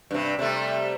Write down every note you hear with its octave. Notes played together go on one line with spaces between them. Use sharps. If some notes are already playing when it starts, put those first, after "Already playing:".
G2 C3
C3 G3 A3